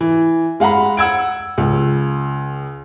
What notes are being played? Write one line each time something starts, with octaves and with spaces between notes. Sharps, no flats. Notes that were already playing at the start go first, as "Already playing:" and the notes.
E3
G#3 F5 F#5 A#5 B5
F#5 E6 G#6 D7
C#2